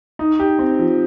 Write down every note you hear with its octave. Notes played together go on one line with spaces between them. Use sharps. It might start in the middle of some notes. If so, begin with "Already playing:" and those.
D#4
G4
C4
F3